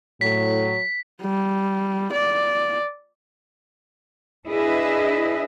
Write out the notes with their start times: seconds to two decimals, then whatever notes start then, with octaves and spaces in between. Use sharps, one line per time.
0.21 A2 F#3 B6
1.22 G3
2.13 D5
4.48 D4 E4 G#4 B4 D#5 E5